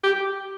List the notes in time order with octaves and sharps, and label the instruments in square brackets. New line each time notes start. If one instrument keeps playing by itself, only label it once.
[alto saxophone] G4